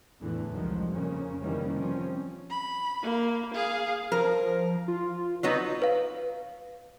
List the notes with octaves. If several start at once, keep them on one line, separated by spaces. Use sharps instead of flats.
E2 A2 D3 E3 A3
C2 D#3 F3 F#3 G#3
F2 C#3 A#3 C#4
C3 D#3 E3 G3 A#3 C#4
F3 G3 C4 C#4
B5
A#3
G#4 F5
F3 A#4
F4
F#3 B3 D#4
B4 F5